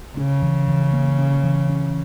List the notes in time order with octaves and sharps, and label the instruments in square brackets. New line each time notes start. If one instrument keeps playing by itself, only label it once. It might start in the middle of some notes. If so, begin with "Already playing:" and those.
[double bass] C#3 [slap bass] C#4
[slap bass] E3
E3
A#3
C#4
E3
C#4